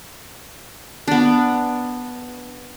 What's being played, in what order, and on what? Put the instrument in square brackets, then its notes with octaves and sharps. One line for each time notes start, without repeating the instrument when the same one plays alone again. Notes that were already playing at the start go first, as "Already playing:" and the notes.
[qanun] B3 D4